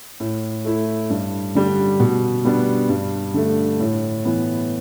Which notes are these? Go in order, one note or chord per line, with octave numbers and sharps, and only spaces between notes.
A2
A3 E4
G2
D3 G3 D4
B2
G3 B3 D4
G2
D3 A3
A2
E3 B3